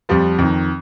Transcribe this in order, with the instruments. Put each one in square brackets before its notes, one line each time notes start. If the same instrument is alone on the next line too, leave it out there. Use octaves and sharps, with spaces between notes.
[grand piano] F2 F3 G3
F2 D#3